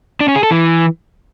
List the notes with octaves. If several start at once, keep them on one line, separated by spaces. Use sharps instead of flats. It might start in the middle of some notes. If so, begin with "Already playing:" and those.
D4
C#4
G#4
A4
E3